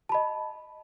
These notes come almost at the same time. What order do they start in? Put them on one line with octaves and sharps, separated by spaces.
A5 B5 D#5